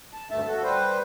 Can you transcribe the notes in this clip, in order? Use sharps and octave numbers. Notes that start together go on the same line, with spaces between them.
A5
D2 G2 A3 E5 A5
F#4 A4
G3 B4 C5